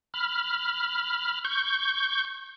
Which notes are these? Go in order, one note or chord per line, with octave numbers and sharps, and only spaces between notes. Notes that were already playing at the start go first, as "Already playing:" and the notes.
B5 F6
C#6 G6